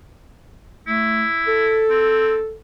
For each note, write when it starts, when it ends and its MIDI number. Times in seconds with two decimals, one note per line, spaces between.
0.87 1.26 57
0.87 1.84 64
1.48 2.55 69
1.90 2.36 60